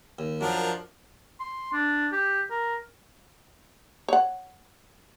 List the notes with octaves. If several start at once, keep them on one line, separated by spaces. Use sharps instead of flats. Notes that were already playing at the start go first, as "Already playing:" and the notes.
D#2
F#2 F3 D4 A#4
C6
D4
G4
A#4
C#5 F#5